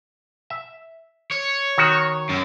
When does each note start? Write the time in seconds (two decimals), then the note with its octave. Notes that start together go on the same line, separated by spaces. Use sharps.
0.50 E5
1.32 C#5
1.78 D#3 F#4
2.29 F#2